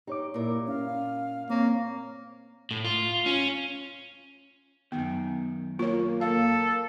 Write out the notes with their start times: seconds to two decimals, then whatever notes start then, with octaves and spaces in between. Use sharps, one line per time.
0.07 D#4 G4 C#5 D6
0.34 A#2 E4 A#4
0.68 C#4 F5
1.50 A#3 C4 C#5
2.71 A2
2.84 F4
3.26 C#4
4.92 F#2 D#3 B3
5.79 A#3 F4 C#5
6.21 A4 F5